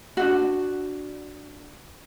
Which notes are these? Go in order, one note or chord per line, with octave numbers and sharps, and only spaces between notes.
D4 D#4 F#4